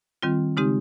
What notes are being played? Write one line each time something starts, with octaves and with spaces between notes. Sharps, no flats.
D#3 G3 C4 F4
C#3 G#3 C4 D#4 G4